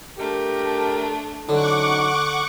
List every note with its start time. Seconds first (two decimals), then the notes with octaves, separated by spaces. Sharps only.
0.19 A3 D4 G4 A#4
1.49 D3 F#3 C#4 D#4 F#5 C#6 D6